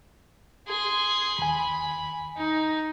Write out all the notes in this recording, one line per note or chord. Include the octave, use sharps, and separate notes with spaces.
G#4 C6
D#2 G#5 B5
D#4